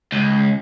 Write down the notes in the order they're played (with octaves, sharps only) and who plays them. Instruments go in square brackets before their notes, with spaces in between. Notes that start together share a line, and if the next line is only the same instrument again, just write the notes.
[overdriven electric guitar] C#2